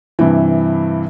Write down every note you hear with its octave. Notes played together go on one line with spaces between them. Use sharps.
G2 C3 E3